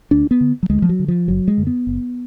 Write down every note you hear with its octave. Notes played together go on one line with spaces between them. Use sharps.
D2 D4
B3
D3
F#3
D2 G#3
F3
F#3
D3
F3
F#1 F#3
G#3
F#2 D3
B3
F#1